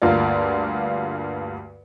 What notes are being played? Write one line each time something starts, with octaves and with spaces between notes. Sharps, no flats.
D2 G2 A#3 F4 A#4 D5